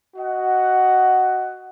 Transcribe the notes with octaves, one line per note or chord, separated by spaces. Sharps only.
F#4 D#5 F#5